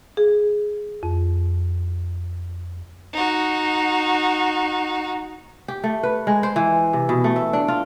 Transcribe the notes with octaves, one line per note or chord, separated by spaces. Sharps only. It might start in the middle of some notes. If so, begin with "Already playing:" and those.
G#4
F2
D#4 F#4
G4
A3
B4
G#3
C5
E3
C3
B2
A3
E5
D4
F4